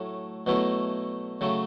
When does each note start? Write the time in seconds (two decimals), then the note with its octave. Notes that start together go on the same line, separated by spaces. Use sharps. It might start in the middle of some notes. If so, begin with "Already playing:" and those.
Already playing: A2 F#3 A3
0.46 B2 F#3 A3 E4
1.41 C#3 F#3 A3